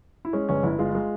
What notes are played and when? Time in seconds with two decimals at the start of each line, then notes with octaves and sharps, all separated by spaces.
0.25 E4
0.33 G#3 C#4
0.49 G1 C#4
0.63 G1 E4
0.79 G#3 F4
0.95 G#3